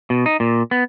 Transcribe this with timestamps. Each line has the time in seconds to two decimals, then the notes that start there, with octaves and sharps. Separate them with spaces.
0.10 B2
0.26 D#4
0.40 A#2
0.71 B3